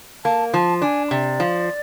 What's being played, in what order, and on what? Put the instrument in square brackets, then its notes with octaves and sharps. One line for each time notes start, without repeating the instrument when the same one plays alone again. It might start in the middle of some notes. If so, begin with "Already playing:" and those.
[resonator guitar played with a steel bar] A#3 [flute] A5
[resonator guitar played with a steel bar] F3 [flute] A5
[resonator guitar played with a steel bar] D4 [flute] G#5
[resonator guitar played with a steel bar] C3 [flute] D5
[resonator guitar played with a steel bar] F3